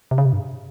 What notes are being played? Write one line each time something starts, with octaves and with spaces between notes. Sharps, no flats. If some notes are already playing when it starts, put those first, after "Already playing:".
C3
C#3
C3
G2